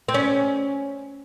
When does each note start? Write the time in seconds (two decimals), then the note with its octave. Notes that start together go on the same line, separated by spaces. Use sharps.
0.08 C4
0.14 C#4